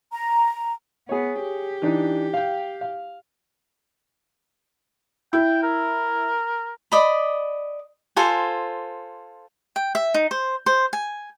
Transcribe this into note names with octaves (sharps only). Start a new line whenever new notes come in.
A#5
B3 G#4 C#5
G4
E3 D4 D#4
F5 G5
F5
E4 G5
A#4
D5 D#5 B5
F4 A4 C5 G#5
G5
E5
D#4
C5
C5
G#5